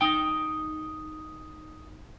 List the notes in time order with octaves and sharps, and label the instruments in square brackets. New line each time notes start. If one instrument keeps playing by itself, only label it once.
[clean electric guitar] D#4 G5